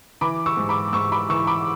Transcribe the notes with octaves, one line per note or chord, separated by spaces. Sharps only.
E3 B5 D6
C#6 E6
G#2
B5 D6
G#2 C#6 E6
B5 D6
E3 C#6 E6
B5 D6